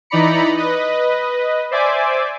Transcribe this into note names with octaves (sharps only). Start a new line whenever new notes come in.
E3 D#4 D5 A#5 B5 C#7
B4 D#5
C5 D5 E5 G#5 D6